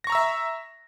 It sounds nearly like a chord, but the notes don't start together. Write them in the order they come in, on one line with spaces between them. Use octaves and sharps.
A#6 C#6 A#5 E6 E5